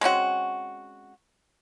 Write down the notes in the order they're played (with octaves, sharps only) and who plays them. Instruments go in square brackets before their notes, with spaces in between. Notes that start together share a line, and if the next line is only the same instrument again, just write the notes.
[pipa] G#3 C4 C#4 F#4